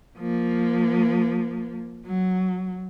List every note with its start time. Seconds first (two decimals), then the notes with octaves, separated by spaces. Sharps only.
0.18 F3 A#3
2.06 F#3